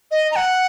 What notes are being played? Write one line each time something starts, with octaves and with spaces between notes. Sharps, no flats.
D#5
A#5
F#5